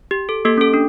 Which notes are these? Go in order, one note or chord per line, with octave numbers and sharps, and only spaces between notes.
G4
A4
A#3 G4 A4
C#4 A4
D4